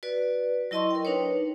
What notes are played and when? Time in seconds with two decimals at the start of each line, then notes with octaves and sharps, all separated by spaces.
0.03 F#4 B4 D5
0.71 F#3 E4 D#5 A5 C6 C#6
0.91 A#4 G5
1.05 D4 D#4 B4 C#5